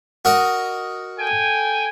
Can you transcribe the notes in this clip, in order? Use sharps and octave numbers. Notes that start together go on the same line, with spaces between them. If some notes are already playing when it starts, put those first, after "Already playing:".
F#4 A#4 D#5
A4 G5 G#5